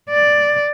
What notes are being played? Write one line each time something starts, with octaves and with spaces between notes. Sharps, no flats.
D5